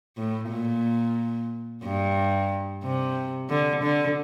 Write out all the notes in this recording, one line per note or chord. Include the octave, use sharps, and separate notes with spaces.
A2
A#2
G2
C3
D3
D3